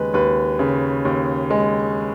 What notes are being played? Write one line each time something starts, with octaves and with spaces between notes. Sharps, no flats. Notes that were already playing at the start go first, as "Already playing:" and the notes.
Already playing: D#2 C#3 G#3 B4
D#2 B4
C#3
D#2
G#3